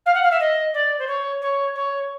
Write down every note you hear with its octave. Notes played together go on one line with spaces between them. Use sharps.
F5
F#5
F5
E5
D#5
D5
C5
C#5
C#5
C#5